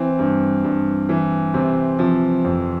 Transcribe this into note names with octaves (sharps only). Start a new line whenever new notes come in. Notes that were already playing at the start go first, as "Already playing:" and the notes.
Already playing: E3 C4
G2
G2
E3
C3 C4
C3 F3
F2 F3